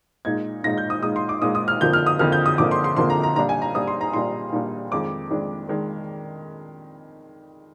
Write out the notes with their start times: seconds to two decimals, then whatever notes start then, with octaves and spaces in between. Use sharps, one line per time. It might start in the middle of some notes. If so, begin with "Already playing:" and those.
0.25 A#2 G#3 D#4 G#6
0.64 A#2 G#3 D#4 A#6
0.78 G6
0.90 D#6
1.03 A#2 G#3 D#4 D#6
1.16 C6
1.29 D6
1.42 A#2 G#3 D#4 D#6
1.55 D#6
1.68 F6
1.81 F2 D3 F3 A#3 G6
1.93 F6
2.06 D#6
2.19 F2 D3 F3 A#3 F6
2.32 G6
2.46 D#6
2.58 F2 D3 F3 A#3 D6
2.71 C6
2.84 C6
2.97 F2 D3 F3 A#3 C6
3.10 A#5
3.23 A#5
3.36 A#2 G3 D4 A#5
3.49 G#5
3.62 A#5
3.74 A#2 G3 D4 D#6
3.88 C6
4.01 A#5
4.13 A#2 G3 D4 C6
4.53 A#2 G3 D4
4.91 F2 D#3 G#3 D4 D6
5.31 F2 D#3 G#3 D4
5.69 D#3 G#3 D4